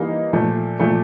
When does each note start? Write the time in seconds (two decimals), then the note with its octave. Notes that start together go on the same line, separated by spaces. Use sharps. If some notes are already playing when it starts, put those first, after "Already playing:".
Already playing: E3 G3 A#3 D#4 F5
0.33 A#2 F3 A3
0.79 A#2 F3 A3